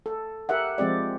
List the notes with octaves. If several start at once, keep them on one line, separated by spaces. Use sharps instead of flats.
A4
G4 A#4 E5 F#5
F3 G#3 C4 G4 D5